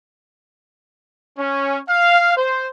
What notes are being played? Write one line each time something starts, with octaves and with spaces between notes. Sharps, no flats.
C#4
F5
C5